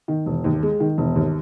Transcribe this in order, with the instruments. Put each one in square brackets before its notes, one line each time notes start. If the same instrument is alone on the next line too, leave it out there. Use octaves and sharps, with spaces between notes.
[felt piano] D#3
E1
D#2
G#3
D#3
E1
D#2